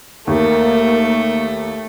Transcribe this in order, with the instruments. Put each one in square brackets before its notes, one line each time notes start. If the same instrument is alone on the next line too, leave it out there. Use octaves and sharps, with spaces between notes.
[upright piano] D#2 [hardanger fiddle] A3 [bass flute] A#3